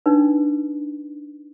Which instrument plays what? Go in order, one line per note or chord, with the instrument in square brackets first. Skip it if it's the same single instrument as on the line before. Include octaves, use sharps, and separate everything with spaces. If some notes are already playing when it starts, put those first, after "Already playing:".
[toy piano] D4 D#4 B4